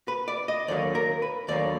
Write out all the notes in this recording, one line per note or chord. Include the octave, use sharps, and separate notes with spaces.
B4
D5
D#5
D#2 D3 F#3 A#3 D5
A#4
B4
D#2 D3 F#3 A#3 D5